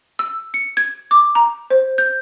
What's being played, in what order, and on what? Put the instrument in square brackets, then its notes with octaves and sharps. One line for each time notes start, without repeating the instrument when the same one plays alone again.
[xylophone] E6
C#7
G#6
D6
A#5
C5
G6